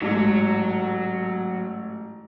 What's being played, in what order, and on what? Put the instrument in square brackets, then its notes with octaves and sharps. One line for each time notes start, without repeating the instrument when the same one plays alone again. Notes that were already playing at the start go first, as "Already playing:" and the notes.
[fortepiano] A1 G#2 [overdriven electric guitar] F#3